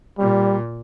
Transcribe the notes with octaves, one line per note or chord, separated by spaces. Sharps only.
A#2 G3